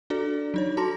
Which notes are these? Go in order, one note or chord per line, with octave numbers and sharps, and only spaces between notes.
D4 F#4 A4 D5
F#3 D#4 C#5
F#4 A4 A5 A#5 C6 A#6